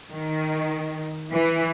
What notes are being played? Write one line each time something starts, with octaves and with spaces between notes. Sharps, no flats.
D#3
E3